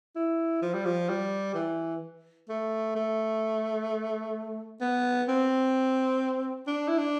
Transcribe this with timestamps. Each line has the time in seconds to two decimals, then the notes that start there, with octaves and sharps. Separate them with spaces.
0.16 E4
0.62 F3
0.73 G3
0.85 F3
1.09 G3
1.54 E3
2.49 A3
2.95 A3
4.81 B3
5.28 C4
6.67 D4
6.88 E4
6.98 D4